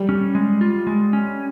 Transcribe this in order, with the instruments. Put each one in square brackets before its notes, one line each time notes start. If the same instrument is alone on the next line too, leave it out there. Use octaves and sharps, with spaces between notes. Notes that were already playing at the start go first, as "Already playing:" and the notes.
Already playing: [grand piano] G3
[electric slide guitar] C#4
G#3
F4
G#3
C#4